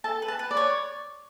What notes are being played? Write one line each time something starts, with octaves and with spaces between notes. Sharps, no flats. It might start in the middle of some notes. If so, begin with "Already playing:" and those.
A4 A5
B4
A5
B4
D5
C#5